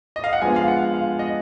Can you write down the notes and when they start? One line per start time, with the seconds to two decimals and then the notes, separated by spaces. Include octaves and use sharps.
0.16 D#5
0.24 F5
0.33 F#5
0.41 F3 G#3 B3 D4 F4 G#5
0.56 F5
0.68 F#5
0.94 F5
1.19 D#5